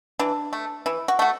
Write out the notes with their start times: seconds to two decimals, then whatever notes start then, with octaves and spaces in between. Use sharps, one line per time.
0.19 E3 D4
0.53 A3
0.86 E3 E4
1.08 F#4
1.19 A3 F#4